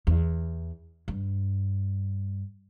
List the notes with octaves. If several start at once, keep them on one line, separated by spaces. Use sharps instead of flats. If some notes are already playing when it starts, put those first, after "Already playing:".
E2
G2